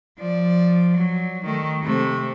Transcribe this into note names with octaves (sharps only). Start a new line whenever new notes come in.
F3 D5
F#3
D#3 A3
C3 A3